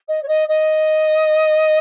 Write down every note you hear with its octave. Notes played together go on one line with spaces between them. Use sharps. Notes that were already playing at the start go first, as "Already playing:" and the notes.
D#5
C#5
D#5
D#5